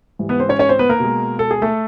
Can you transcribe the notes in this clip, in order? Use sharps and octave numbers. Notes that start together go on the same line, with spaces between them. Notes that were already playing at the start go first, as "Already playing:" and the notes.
G#2 E3 G3
B3 B4
C4 C5
C#4 C#5
C#4 C#5
C4 C5
B3 B4
A#3 A#4
B2 G#3
A4
G#4
A3 A4